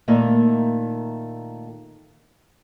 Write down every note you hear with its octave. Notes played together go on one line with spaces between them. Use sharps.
A#2 D#3 A3 A#3 D#4 E4